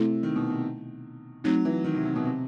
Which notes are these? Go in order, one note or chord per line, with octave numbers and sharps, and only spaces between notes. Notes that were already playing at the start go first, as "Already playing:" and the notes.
Already playing: C3 A3 E4 A4
D#3
B2
C3
F#3 A3 C4 D#4
E3
D#3
C3
C3
B2
C3